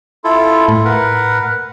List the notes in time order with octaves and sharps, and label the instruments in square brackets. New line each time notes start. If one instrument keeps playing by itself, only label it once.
[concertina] E4 F4 A4
[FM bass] A2
[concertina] A#4 B4 F#5